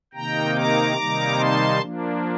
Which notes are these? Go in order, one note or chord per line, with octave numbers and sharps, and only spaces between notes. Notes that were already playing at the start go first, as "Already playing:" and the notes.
C3 D#3 A#3 D#4 G5 A#5
A#5 D6
C3 D#3 G3 A#3 D#4
A5 C6
F3 A#3 D4